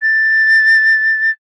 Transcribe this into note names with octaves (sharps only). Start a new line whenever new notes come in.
A6